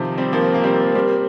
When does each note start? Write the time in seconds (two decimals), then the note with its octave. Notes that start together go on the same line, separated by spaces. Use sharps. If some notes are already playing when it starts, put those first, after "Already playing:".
Already playing: C3 D#3 F3
0.18 G3 C4
0.33 F3 A#3 A#4
0.54 A#3
0.64 G3 C4
0.95 G3 C4